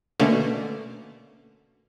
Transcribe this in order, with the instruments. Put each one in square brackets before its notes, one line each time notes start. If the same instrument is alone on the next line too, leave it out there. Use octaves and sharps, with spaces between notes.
[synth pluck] B2 D3 A3 A#3 C#4